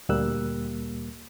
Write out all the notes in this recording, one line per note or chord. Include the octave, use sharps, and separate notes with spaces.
D2 A#2 G3 A#3 E6 F#6